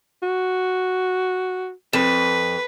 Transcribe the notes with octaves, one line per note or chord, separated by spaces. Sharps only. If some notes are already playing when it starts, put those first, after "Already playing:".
F#4
F2 B4